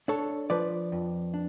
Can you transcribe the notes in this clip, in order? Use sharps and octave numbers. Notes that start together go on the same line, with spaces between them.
D4 A4 C#5
F3 B4 D5
F2
D4